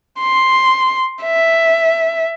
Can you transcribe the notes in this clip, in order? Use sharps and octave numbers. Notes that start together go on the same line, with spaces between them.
C6
E5